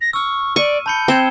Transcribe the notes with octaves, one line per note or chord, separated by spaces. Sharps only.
A#6
C#6 E6 F6
D5 C#6 D#7
A5 B5 G6 C#7
C4 G#6 E7 G7